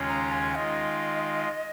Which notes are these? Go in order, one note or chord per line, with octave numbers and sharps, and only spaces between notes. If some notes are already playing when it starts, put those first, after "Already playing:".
Already playing: D#2 C#3 G#3 C#4 F4
A#5
G#5
D#3 G#3 F4 D#5